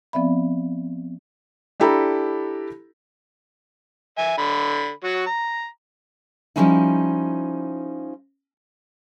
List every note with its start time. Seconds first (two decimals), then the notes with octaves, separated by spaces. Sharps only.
0.13 F3 B3 C4 D5 E5 B5
1.80 D4 E4 G4 A4 A#5 B5
4.18 E5 G#5
4.38 D3 B5
5.04 F#3 F#4
5.26 A#5
6.56 F3 G3 G#3 C#4 D#4 E4